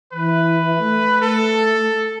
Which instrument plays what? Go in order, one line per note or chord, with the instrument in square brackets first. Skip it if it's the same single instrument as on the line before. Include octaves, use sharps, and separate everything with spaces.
[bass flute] E3 [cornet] B4
[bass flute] A3
[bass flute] A3 [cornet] A4